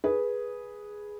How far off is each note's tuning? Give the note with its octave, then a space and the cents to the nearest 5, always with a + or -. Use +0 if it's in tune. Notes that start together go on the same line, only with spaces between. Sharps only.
G#4 +0 B4 -10